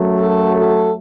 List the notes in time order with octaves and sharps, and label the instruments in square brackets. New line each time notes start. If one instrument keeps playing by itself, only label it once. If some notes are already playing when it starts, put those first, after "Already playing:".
Already playing: [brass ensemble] F#2 F#3 A3
F#4 A4
F#4 A4